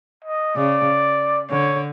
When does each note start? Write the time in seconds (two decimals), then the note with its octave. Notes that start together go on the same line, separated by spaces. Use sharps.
0.24 D#5
0.56 C#3 D5
1.50 D3 C#5